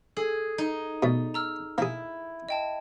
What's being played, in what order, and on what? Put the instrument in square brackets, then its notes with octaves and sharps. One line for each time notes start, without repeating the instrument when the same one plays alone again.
[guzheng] G#4 [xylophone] A4
[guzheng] D#4
[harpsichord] B2 A3 [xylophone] D5
[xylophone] A#5 E6 F6
[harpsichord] A#3 G#4 [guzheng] E4
[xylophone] D#5 G5 A5